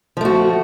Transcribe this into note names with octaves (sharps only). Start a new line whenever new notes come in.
F3 A3 F#4